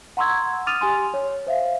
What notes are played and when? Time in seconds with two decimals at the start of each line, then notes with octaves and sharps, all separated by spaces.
0.17 F#5 A#5 C6 C#6 E6 G#6
0.67 D6 D#6 F6 A6 D#7 F7
0.81 G4 G#5 C6
1.14 C#5
1.47 C5 E5 F5